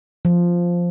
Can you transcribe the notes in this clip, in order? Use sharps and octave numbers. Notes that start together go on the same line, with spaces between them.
F3